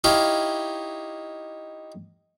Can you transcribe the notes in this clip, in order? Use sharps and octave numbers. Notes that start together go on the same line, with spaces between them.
D#4 E4 G4 C#5 F5 G5